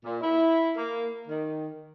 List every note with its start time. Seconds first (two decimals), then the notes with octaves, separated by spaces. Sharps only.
0.04 A#2
0.21 E4
0.76 A#3
1.27 D#3